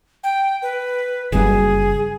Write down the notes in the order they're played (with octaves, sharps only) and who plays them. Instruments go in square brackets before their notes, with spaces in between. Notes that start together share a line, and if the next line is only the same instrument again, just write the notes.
[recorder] G5
B4
[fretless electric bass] F#1 F#2 G3 [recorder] G#4